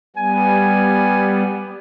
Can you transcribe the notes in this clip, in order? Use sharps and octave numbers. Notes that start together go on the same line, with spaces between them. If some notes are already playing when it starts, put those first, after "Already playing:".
G3 B3 G#5